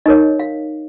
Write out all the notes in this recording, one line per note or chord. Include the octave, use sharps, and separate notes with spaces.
D#4 A#4 C#5 D#5
F5